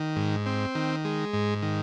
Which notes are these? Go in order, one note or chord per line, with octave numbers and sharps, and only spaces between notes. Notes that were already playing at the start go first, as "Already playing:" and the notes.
Already playing: D#3
G#2
C4
D#3
G#3
G#2
D#3